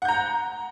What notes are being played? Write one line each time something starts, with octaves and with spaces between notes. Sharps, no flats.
F#5 A#5 G6